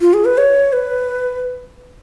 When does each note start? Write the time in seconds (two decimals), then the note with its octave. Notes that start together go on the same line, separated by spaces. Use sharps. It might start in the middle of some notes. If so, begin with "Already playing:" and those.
0.01 F4
0.14 G#4
0.25 B4
0.38 C#5
0.73 B4